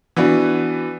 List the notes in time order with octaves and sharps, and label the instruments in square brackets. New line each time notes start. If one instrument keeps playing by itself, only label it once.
[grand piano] E3 B3 D4 F#4